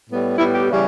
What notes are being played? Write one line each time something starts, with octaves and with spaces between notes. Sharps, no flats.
A2 G3 B3
A2 G3 B3 E4
G4
C#3 E3 G3 C#4